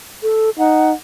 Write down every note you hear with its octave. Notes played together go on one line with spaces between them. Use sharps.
A4
D#4 F#5